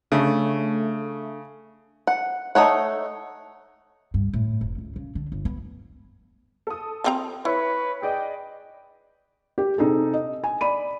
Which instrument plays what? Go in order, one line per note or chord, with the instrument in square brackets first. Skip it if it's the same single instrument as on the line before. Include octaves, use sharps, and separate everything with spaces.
[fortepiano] C#3 [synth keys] A3 [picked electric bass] D4
[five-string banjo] F#5
A3 D#4 C#5 F#5
[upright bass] G2
A2
F1
C#2
C#3
D3
G1
B3
[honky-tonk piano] A4 D#6
[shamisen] F3 C4 A#5
[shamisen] E4 [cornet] B4 [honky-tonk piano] C#5
[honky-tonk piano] G#4 D5 D#5 [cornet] G5
[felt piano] G4
C3 D#4 G#4 A4
D#5
G#5
D5 B5 D#7